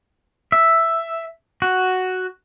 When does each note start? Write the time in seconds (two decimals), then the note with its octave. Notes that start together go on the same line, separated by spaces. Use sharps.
0.52 E5
1.62 F#4